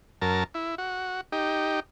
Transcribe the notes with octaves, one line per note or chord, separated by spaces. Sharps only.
F#2 A#4 A5
E4
F#4
D#4 G4